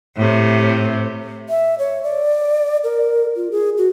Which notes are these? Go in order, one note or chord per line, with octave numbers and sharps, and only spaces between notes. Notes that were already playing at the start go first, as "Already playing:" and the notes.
A2 C3
E5
C#5
D5
A#4
F4
G#4
F#4